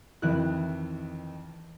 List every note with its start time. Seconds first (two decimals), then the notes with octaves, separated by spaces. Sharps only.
0.22 F2 D#3 E3 E4 F#6